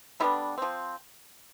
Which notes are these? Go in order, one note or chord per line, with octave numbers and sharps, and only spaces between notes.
D3 G3 B3 D4 E4
F3 C4